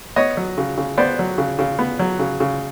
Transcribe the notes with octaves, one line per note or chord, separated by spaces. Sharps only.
B3 C#5 D#5
F#3
C#3
C#3
B3 C5 D5
F#3
C#3
C#3
B3
F#3
C#3
C#3